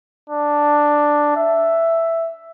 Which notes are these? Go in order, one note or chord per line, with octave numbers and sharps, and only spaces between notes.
D4
E5